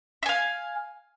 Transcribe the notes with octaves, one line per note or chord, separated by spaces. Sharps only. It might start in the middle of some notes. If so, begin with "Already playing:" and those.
E5 F5 G#5